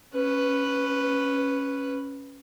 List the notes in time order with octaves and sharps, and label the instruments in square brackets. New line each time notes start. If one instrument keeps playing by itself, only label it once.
[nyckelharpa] C#4 B4